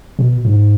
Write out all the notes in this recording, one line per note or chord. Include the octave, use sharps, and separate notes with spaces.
B2
G#2